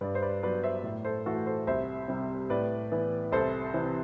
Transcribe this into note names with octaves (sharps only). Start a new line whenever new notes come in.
G2 B4 D5
C5
B4 D5
F#3 B3 B4 D5
C5 E5
A2
A4 C5
E3 A3 F#4 A4
A4 C5
C2 C5 E5
C3 G3
A2 B4 D5
E3 B3
C2 A4 C5
C3 E3